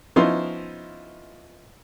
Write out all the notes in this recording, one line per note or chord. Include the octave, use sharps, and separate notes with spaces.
F3 B3 C#4 D#4 E4 C6